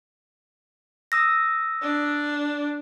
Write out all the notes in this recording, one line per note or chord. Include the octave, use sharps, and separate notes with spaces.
D#6 E6 A#6
D4